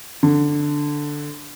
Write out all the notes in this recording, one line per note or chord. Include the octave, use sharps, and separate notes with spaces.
D3